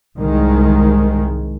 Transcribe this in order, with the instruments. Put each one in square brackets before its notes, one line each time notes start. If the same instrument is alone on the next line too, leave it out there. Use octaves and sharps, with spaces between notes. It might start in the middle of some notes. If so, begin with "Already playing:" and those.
[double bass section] C2 G#2 D#3 G#3